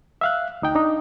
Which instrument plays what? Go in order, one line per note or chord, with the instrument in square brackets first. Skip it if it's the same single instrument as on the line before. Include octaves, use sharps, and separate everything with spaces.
[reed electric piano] E5 F5 F#6
D2 D#4 G5
D4 D#4